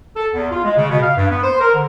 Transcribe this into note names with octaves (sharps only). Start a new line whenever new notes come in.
A4
E2
F4
G#3
C#3
B2
F5
G2
B3
C5
A#4
D3